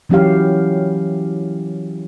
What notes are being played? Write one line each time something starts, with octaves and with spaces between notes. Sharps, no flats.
E3 F#3 C#4 E4 G4 F5